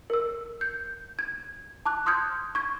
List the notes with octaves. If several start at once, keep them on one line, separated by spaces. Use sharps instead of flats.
A#4 E6
G6
G#6
A5 D6 F#6
C6 D#6 F6 G6 G#6
C#6 G#6